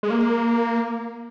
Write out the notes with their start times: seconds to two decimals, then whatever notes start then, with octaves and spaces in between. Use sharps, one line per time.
0.03 G#3
0.10 A#3